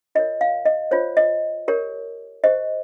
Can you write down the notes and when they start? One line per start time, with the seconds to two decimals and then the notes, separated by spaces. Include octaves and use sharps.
0.15 F4 A#4 C#5 D#5
0.41 F5
0.65 D#5
0.91 F4 C5 C#5
1.17 D#5
1.68 G4 A#4 C#5
2.44 G4 C5 D#5